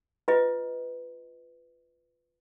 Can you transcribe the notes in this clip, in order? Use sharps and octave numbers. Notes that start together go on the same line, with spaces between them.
F4 B4 D#5